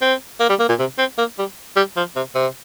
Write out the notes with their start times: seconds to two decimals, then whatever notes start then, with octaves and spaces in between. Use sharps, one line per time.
0.02 C4
0.40 A#3
0.49 G3
0.60 A#3
0.69 A#2
0.79 C3
0.98 C4
1.18 A#3
1.38 G3
1.76 G3
1.97 F3
2.16 C3
2.35 C3